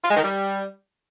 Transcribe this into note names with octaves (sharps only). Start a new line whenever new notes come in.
F4
G#3
D#3
G3